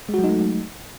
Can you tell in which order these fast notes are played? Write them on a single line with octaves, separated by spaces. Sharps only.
G#3 F#4 F#3 D#4 A3